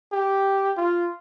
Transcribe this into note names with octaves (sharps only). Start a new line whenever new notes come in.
G4
F4